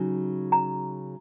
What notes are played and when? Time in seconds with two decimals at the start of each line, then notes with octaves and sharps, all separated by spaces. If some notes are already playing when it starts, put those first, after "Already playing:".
Already playing: C#3 F#3 D#4
0.52 A#5